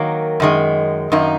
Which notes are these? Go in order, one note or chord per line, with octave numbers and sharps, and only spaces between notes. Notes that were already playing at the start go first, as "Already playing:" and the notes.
Already playing: D#3 F#3 A#3
F#2 D#3 G#3
F#2 D#3 A#3 D#4